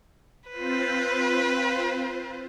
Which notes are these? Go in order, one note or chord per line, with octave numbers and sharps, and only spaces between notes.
C4 F4 B4 C5